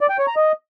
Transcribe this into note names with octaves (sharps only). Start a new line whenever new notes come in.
D5
G5
C#5
A#5
D#5